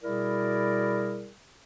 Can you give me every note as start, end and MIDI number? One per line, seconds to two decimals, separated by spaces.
0.03 1.30 47
0.03 1.30 55
0.03 1.30 64
0.03 1.30 68
0.03 1.30 70
0.03 1.30 74